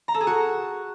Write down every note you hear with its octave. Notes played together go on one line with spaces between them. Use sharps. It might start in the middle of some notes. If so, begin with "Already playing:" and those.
A#5
A4
G#4
F#4